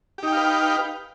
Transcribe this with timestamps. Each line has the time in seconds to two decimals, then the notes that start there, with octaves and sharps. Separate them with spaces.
0.18 G4
0.23 D#4
0.28 G5
0.32 F5
0.37 B4